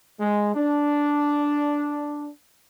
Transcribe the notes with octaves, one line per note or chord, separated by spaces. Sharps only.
G#3
D4